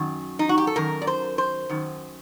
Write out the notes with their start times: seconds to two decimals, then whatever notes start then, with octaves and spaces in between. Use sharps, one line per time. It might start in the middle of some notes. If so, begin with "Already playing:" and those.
Already playing: F#2 D#3
0.39 D#4
0.49 F#4
0.58 G4
0.67 A4
0.76 F#2 D#3 A#4
1.02 D5
1.07 C5
1.38 C5
1.69 F#2 D#3